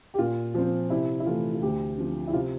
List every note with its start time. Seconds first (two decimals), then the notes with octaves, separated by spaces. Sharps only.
0.14 G4
0.19 A#2 F4
0.54 F3 C4
0.90 C3 E4
1.20 E4
1.26 E3 A3 F4
1.54 F4
1.62 D2 G4
1.98 D3 F3 C4
2.28 E4
2.33 C3 F4